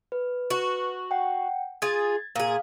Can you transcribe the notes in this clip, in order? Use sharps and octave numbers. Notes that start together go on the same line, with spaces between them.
B4
F#4
F#5 G5
F4 G#4 G#6 A6
A#2 G#4 F5